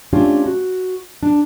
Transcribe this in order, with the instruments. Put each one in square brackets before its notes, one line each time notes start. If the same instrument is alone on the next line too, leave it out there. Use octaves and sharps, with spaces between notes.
[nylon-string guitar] A3 C#4 D4 F4 G4 F5
F#4
D4